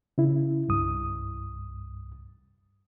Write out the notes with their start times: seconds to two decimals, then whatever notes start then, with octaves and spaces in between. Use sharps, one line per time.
0.18 C#3 E4
0.68 C2 G2 D#6